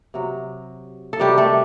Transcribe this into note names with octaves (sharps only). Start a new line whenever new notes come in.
C3 F#3
A4
C3 D#3 F#3 G3 G4
A3 A4